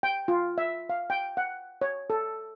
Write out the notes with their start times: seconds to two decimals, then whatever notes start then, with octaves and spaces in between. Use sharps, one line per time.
0.03 G5
0.28 F4
0.58 E5
0.89 F5
1.10 G5
1.37 F#5
1.82 C#5
2.10 A4